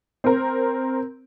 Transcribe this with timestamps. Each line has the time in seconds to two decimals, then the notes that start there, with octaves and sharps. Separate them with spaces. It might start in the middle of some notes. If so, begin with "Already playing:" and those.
0.24 C4 A#4